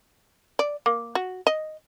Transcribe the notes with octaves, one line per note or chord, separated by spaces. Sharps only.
D5
A#3
F#4
D#5